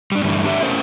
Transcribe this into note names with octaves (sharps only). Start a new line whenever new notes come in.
G3 D4
G2 D3 E3 G3 A3
D4 G4 E5
C#4 A#4 C5